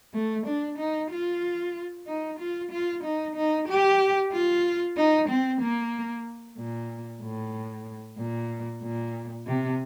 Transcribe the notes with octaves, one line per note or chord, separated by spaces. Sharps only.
A3
D4
D#4
F4
D#4
F4
F4
D#4
D#4
G4
F4
D#4
C4
A#3
A#2
A2
A#2
A#2
C3